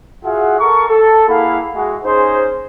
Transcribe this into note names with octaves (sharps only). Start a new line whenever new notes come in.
F4 F#4 G#4 E5 F#5
A4 A#4 C#6
A4
A#3 E4 G#4 F5 F#5 B5
G#3 E4 F#4
C#4 D#4 G#4 C5